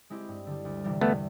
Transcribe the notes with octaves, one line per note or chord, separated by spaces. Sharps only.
G#3 C4 E4 G4
G2
D3 G3
D2
C3 E3 G3
E2 A3 B3